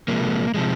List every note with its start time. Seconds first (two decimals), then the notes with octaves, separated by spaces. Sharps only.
0.08 C3 F3 G#3 A#3
0.54 C3 F3 G#3